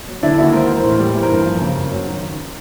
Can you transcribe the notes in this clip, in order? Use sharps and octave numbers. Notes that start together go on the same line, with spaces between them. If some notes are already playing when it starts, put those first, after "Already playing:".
F#3
D3 D4 E4
D#2 E4 F#4
G#3 A#4 C5
E3
A#4 C5
A2
G3
E3
A#4 C5
G2
F3
C#3
F#2
F#3
D#3